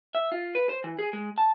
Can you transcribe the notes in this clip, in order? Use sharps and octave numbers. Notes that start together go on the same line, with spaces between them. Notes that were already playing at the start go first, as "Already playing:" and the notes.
E5
F4
B4
C5
E3
G#4
G#3
A5